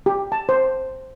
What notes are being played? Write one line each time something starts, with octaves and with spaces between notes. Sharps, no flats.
G4
A5
C5